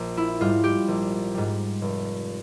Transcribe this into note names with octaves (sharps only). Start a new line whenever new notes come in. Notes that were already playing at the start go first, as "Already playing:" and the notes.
Already playing: A#1
E4
G#2 G3 F4
G4
A#1
G#2 G3
F1